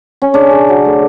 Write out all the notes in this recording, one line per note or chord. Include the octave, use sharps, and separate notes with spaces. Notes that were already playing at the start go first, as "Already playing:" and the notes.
C#4
C#3 D4
C#3
F#3
A3